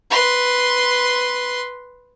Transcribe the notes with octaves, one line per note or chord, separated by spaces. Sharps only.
B4 C6